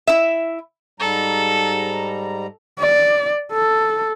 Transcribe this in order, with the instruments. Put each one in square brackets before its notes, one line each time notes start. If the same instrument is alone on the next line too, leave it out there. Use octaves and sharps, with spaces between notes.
[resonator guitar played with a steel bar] E4 E5
[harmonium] G#2 G3 A#5 [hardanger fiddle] A4
[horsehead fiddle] D5
A4